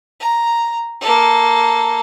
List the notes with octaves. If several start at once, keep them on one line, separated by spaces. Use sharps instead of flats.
A#5
A#3 A4